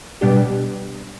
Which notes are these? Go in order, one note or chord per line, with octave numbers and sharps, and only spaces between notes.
B2 G3 B3 D4 G4